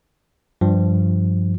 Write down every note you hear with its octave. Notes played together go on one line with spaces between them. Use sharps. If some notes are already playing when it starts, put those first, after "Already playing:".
G2 F3